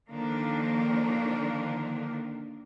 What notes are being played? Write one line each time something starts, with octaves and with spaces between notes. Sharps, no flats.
D3 D#3 F3 A#3 D4